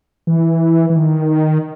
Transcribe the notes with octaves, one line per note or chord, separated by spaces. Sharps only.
E3
E3
D#3